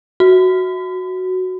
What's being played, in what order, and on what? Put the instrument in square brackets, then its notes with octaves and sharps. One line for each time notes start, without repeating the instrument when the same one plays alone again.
[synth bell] F#4